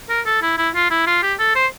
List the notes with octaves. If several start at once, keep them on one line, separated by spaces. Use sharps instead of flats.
A#4
A4
E4
E4
F4
E4
F4
G4
A4
C5